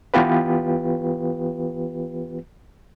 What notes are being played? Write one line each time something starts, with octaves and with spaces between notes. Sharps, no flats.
E3 B3 F4 G4 B4